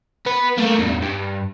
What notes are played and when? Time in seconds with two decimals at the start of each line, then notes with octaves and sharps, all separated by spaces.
0.26 B3 B4
0.57 A3 A#3
0.79 E2 G2
1.02 G2